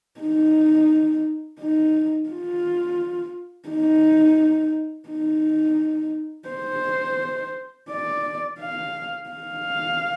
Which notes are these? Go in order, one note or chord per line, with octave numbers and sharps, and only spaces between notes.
D#4
D#4
F4
D#4
D#4
C5
D5
F5
F5